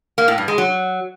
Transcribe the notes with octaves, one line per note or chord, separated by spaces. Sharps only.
A#3
A2
G2
G#3
F#3